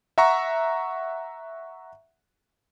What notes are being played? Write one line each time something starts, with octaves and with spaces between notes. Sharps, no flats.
E5 F#5 A#5 C#6